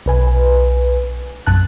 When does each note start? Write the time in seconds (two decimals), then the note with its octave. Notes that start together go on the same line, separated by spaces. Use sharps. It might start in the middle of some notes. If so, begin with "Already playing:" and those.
0.06 B1 B4 G#5
1.47 A#1 F#2 A5 F#6